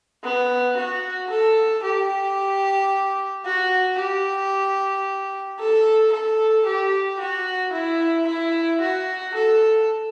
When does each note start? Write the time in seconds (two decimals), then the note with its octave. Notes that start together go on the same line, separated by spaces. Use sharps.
0.24 B3
0.77 F#4
1.30 A4
1.83 G4
3.45 F#4
3.99 G4
5.59 A4
6.12 A4
6.66 G4
7.20 F#4
7.73 E4
8.27 E4
8.80 F#4
9.34 A4